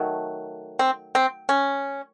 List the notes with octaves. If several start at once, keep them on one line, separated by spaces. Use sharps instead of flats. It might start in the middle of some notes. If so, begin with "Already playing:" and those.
Already playing: D#3 F#3 A3
C4
C4
C#4